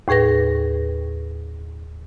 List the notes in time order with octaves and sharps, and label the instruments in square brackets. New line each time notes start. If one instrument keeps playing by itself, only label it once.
[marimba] D#2 A2 G#4 B4 A#6